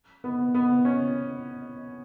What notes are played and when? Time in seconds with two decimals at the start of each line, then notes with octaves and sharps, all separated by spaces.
0.24 B3
0.54 B3
0.85 C#4